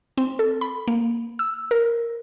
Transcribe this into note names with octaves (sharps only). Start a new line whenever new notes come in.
C4
A4
B5
A#3
E6
A#4